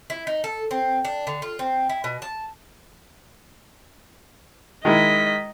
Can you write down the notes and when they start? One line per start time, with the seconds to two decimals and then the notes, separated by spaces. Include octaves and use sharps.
0.10 E4
0.27 D#4
0.44 A4
0.71 C4
1.05 D4
1.27 D3
1.42 F4
1.59 C4
1.89 E4
2.04 B2
2.22 A5
4.85 D#3 G#3 E4 D#5 B6